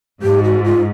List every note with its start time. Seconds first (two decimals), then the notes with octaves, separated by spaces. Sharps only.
0.22 G#2 G4
0.44 F#4
0.64 F4